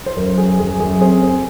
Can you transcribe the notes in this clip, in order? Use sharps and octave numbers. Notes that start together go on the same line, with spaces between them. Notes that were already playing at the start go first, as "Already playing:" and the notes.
C5
F#2 A#4
F#2 G#4
F#2 G#4
F#2 G#4
C4 G#4 C5